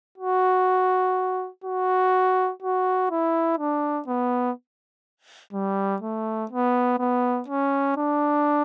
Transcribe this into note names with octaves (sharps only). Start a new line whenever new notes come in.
F#4
F#4
F#4
E4
D4
B3
G3
A3
B3
B3
C#4
D4